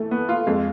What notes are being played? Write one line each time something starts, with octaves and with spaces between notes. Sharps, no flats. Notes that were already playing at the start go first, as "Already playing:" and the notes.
Already playing: E3 A3
B3
F4
F2 G#3